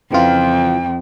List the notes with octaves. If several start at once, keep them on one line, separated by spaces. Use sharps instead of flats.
F2 C#3 E3 F4 G5